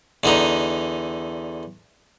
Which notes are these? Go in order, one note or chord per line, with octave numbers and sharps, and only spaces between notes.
E2 D3 D#4